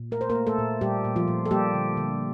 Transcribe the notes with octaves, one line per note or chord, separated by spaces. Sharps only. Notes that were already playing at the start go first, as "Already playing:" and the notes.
Already playing: A#2
A3 A#4
C5
A#3 A#4
A3
A3 A4
A#2
A#2 G3 G4
A#2
F3 F4
A#2
A4
G3 A#3 G4
D3
D3